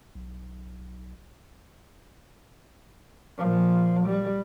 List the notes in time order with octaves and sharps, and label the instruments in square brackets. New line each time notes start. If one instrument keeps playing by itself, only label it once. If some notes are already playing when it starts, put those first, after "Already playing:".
[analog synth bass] B1
[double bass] A#2 F3
G3